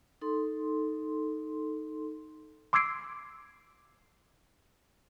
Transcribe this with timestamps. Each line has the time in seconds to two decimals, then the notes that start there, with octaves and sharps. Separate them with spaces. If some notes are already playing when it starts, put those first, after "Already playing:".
0.21 D#4 A4 C6
2.73 C6 D6 E6 G#6 C7 D7